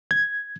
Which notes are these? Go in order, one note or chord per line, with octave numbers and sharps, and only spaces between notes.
G#6